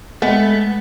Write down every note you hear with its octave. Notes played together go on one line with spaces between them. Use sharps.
G#3 A3 B3 D#5